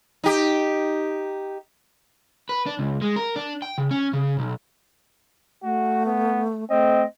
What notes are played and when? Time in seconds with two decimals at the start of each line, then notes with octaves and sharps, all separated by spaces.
0.24 D#4 G4
2.49 B4
2.66 D4
2.79 C#2
3.02 G#3
3.16 A#4
3.36 D4
3.62 G5
3.78 C#3
3.91 C#4
4.13 C#3
4.39 B1
5.63 A3 F#4
6.06 B3
6.70 A3 C4 D#5